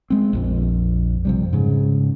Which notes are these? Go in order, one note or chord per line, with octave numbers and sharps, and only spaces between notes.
G#3 C4
A#1 F2
F2 C3 G3
G#2 C#3